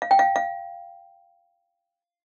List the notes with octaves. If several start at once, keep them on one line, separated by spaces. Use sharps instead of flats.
F5
G5
F5
F5